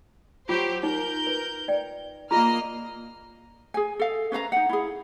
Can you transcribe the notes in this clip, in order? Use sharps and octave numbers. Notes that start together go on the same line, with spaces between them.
F#3 F4 G4 C5
D#4 A#4 C5 G6
B4
D5 G5
A#3 F4 G#4 D#5 A#5 F6
G#4 G#5
A4 F5
C#4 B4 F5 A#5
D#4 F#5
E4 G#4